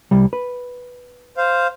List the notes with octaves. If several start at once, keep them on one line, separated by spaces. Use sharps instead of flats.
C2 G3
B4
C5 F5